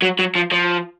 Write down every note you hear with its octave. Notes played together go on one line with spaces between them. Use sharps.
F#3
F#3
F3
F3